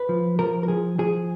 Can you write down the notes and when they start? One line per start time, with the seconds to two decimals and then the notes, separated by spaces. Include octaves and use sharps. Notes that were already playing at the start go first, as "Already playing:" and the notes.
Already playing: B4
0.09 F3
0.39 F3 A#4
0.63 A#4
0.68 F3 G#4
0.98 F3 G#4